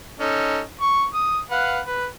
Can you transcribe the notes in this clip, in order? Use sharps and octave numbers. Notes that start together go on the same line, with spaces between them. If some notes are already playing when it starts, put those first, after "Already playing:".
C#4 D#4 A4
C#6
D#6
B4 F5 F#5
B4